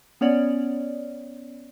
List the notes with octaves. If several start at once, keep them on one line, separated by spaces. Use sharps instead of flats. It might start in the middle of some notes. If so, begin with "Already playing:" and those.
B3 C#4 C#5 D5